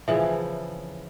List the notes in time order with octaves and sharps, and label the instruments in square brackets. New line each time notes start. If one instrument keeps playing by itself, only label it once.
[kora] C#3 E3 F3 [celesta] E5